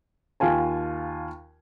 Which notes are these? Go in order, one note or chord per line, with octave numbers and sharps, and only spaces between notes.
D#2 F4 G#5 A5